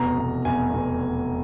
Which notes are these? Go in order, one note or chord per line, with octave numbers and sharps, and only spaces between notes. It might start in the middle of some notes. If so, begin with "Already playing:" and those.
Already playing: F1 E2 B2 A#5
F1 E2 B2
F1 E2 B2 G#5
F1 E2 B2